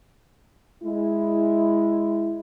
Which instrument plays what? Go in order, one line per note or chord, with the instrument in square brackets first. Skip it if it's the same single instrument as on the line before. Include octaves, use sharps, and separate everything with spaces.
[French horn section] G#3 E4